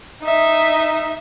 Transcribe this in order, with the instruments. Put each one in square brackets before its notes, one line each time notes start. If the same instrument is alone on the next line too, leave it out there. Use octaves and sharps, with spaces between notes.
[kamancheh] D#4 E5